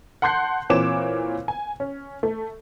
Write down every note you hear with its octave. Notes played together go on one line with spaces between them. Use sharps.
F#5 A5 C6 F#6 G6 C7
A#2 E3 C4 C#5 D6 E7
G#5
C#4
A3